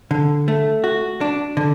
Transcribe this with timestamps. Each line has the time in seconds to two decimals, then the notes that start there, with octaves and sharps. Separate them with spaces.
0.11 D3
0.48 A3
0.84 F#4
1.21 D4
1.57 D3